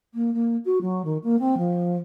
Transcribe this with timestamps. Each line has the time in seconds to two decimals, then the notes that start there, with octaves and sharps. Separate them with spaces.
0.14 A#3
0.33 A#3
0.65 F#4
0.81 F#3
1.04 D#3
1.23 A#3
1.39 C4
1.58 F3